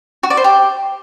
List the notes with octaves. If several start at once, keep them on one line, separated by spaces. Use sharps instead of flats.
F#4
D5
C5
G4